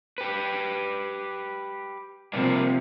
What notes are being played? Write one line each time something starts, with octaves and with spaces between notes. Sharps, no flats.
G4 B4
C3 F3 G3 A#3 D4